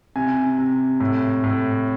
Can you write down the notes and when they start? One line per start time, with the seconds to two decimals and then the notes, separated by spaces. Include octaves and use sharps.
0.16 C3 G#5
0.58 C3
1.00 A2
1.44 A2